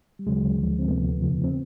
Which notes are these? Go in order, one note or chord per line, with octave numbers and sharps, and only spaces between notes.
G3
D2 C#3 F#3 G#3
D2 D3 F3
C4
D2 C3 F3 A3 B3
E2 C#3 F3
C4